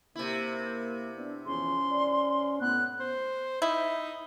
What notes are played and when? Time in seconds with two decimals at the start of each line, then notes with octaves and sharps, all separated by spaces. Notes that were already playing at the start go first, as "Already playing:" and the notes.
0.16 C3 A#3 E4
1.15 B3 D4
1.46 E2 F3 C#4 G#4 C6
1.91 D5
2.61 A2 B3 F#6
3.00 C5
3.62 D#4 E4